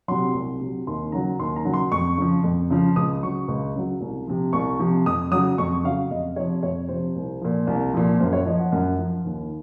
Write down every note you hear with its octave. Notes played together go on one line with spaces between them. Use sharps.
C3 F#3 C6
C2
C3 F#3
D#2 C6
C#3 F#3 A#5
D#2 C6
A#5
C#3 F#3
C6
F2 C#6
C#3 F3
F2
C#3 F3
C#2 D#6
C#3 F#3 C#6
C#2
C#3 F#3
C2
C3 F3
C2 C#6
C3 F3
F2 D#6
C#3 F#3 D#6
F2 C#6
C#3 F#3 F5
F2 D#5
C3 F3 C#5
F2 C#5
C3 F3 C5
C2
A#2 F3
C2
A#2 F3
F#2 C5
C#5
F3 D#5
F#5
F#2
F3
D#2